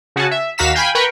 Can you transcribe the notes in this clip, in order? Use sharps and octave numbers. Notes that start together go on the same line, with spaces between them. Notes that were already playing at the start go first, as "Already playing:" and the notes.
C#3 F#4 F#5 G#5 A5
E5
D#2 F#4 F5 A#5 B6 E7
F5 G5 G#5 B5
A#4 B4 G5 B5 C#6